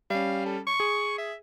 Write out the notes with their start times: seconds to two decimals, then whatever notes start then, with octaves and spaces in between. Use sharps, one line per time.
0.10 G3 C#4 F5
0.46 A4
0.67 C#6
0.80 G#4
1.18 E5